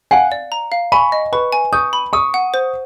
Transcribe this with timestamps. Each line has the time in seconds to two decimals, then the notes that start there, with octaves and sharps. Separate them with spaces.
0.11 F5 F#5 G#5
0.32 D5
0.52 A#5
0.72 F5
0.92 G#5 B5 C#6
1.12 D#5
1.33 B4 B5 C#6
1.52 G#5
1.73 C#6 D#6 G6
1.93 B5
2.13 C#6 D#6 E6
2.34 F#5
2.54 C5